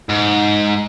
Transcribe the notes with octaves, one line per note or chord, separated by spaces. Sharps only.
G#2